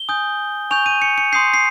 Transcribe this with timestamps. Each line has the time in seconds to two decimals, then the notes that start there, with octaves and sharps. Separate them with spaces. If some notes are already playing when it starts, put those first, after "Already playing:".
Already playing: G7
0.09 G#5 D#6 G6
0.71 G#5 C#6 G6 F7
0.86 D#7
1.02 C#7
1.18 C#7
1.32 C6 D#6 G6 C7
1.54 C7